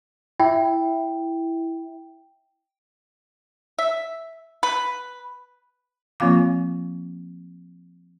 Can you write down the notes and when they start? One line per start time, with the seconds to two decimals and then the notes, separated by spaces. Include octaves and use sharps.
0.40 E4 G5
3.78 E5
4.63 B4
6.20 F3 A#3 C4 F4 F5 D6